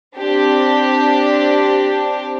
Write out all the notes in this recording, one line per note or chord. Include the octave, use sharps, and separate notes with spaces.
C4 D4 G4